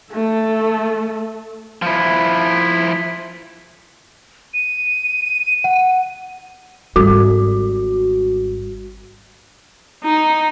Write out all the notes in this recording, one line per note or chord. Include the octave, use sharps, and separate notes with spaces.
A3 A4
F3 E4
D#7
F#5
G#1 G3 F#4
D#4